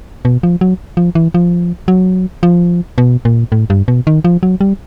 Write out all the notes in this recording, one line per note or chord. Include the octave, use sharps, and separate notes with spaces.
B2
F3
F#3
F3
E3
F3
F#3
F3
B2
A#2
A2
G2
B2
D#3
F3
F#3
G3